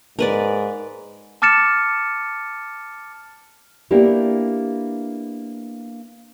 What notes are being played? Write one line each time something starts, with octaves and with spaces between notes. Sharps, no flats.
G#2 A#4 B4 D5
A5 D6 F6 A6 C#7 E7
A#3 B3 D4 E4 G4